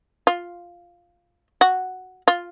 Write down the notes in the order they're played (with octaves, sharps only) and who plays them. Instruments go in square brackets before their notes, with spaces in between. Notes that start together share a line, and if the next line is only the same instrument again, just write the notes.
[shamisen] F4
F#4
F4